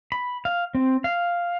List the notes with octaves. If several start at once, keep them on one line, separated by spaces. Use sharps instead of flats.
B5
F5
C4
F5